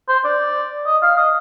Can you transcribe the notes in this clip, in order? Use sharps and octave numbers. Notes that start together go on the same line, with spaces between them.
C5
D5
D#5
F5
D#5